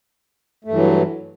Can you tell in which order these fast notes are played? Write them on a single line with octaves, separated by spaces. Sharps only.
A3 G2 E3 F#3